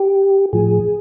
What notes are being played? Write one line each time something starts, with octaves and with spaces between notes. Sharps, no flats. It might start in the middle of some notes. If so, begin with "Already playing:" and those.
Already playing: G4
A2 F3 G#4